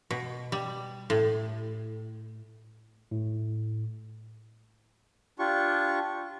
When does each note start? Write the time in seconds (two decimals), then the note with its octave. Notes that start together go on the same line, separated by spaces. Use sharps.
0.11 B2
0.52 G3
1.10 A2
3.11 A2
5.39 D4 F4 G4 C#6